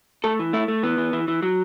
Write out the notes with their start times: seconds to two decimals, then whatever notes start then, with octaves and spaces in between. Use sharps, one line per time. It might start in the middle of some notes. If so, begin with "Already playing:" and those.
0.24 A3 A4
0.39 E3
0.53 A3 E4
0.68 A3
0.83 E3 B3
0.98 E3
1.13 E3
1.28 E3
1.42 F#3